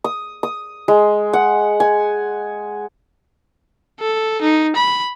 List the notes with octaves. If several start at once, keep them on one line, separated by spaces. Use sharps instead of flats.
D#6
D#6
G#3
F#5
G#5
A4
D#4
B5